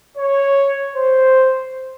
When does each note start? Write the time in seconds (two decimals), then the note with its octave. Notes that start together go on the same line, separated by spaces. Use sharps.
0.17 C#5
0.95 C5